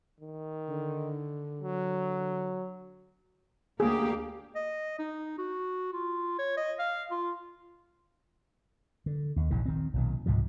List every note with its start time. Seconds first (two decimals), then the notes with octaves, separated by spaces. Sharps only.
0.20 D#3
0.69 D3
1.61 F#3
3.80 D2 A#3 G4 G#4
4.55 D#5
4.99 D#4
5.38 F#4
5.93 F4
6.39 C#5
6.57 D#5
6.79 F5
7.11 F4
9.06 D3
9.36 D#2
9.50 A#1 G2 D3 E3
9.66 D#3 C4
9.94 B1 A#2 D#3
10.26 C#2 G#2 C3 F3